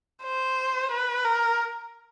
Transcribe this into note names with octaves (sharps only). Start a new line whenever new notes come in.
C5
B4
A#4